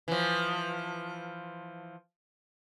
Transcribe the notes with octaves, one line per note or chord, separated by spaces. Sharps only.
E3 F3